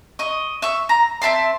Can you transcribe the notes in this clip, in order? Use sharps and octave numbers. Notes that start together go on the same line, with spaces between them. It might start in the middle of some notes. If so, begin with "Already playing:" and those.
D#5 C#6
E5 C#6
A#5
C4 E5 A5 C6